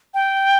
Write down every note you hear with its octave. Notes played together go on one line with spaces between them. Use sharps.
G5